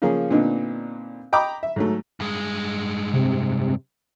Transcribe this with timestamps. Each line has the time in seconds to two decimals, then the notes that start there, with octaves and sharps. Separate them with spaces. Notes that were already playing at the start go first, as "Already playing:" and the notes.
0.02 C#3 F3 A#3 C#4 G#4
0.31 A#2 D3 B3 C4 D4 D#4
1.33 D#5 G5 A#5 B5 D6 D#6
1.63 E5
1.76 G#2 F#3 A3
2.20 G2 G#3
3.13 C3